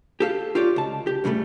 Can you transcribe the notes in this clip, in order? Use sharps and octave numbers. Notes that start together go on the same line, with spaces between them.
G4 A4 F5
F4 G4 C#5 D5
C#2 A5
G4
G2 C#3 F#3 G3 A3